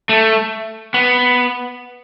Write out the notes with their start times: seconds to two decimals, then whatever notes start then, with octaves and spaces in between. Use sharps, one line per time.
0.09 A3
0.94 B3